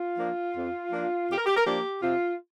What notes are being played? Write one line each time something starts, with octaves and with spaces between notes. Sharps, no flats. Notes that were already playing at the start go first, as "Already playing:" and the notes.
Already playing: F4
F3 A#3 D4
F2
F3 A#3 D4
F2 G4
A#4
G4
A#4
F3 A#3 D4 G4
C3 F4